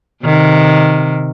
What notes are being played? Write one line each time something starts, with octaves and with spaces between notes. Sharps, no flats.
C3 D#3